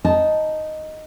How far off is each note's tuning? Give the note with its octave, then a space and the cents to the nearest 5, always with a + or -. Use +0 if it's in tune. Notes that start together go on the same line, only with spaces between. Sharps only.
D#4 +0 A5 -10